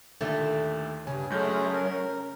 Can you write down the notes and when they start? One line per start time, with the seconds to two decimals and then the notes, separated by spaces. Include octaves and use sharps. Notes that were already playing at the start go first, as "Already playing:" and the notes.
0.21 D#2 A#2 D3 A3
1.07 G2 C#3 G#5
1.32 F#2 G#3 A3 G6
1.74 A#4